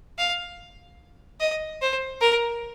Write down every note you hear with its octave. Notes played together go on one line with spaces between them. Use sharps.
F5
D#5
C5
A#4